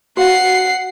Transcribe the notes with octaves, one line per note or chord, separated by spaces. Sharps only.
F#4 F5 F#5 C7